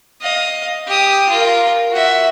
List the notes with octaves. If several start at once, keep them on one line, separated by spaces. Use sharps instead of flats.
D#5 F5
G4 D#6
F4 A#4
F#4 E5